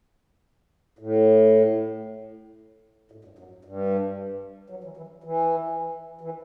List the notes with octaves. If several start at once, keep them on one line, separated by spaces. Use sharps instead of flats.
A2
A2
G2
F#2
G2
F#3
E3
E3
E3
E3